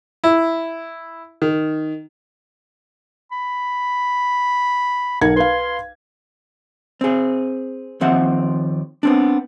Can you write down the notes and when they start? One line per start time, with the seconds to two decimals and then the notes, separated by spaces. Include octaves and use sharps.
0.24 E4
1.42 D#3
3.32 B5
5.21 B1 A#4 F#5 G#6
5.36 B4 F5 C6
7.01 C4 G#4
8.01 D#2 F3 C4 E5 F#5
9.03 B3 C4 D4